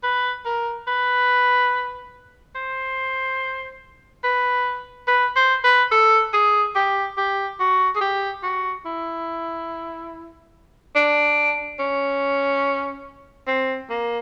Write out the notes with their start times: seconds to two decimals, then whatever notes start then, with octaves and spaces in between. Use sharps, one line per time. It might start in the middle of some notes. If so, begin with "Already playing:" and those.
0.03 B4
0.45 A#4
0.88 B4
2.55 C5
4.24 B4
5.08 B4
5.36 C5
5.64 B4
5.92 A4
6.34 G#4
6.75 G4
7.17 G4
7.60 F#4
7.95 G#4
8.01 G4
8.43 F#4
8.85 E4
10.95 D4
11.80 C#4
13.47 C4
13.90 A#3